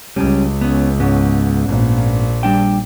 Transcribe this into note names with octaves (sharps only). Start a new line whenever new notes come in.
C#2 G3 C#4
B3 C#4
G#2 B3 C#4
A#1 A#2
G3 D4 G5